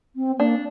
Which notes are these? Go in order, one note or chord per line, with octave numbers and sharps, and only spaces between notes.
C4
A#3 D4